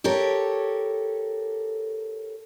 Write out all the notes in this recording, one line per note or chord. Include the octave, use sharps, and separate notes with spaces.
G4 A4 A#4 C#5